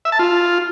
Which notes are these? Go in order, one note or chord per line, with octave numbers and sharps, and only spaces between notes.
E5
A5
F4